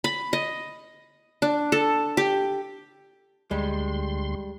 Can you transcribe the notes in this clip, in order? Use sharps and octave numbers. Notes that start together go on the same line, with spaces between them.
B5
D#5
D4
A4
G4
D2 G3 G#3 C6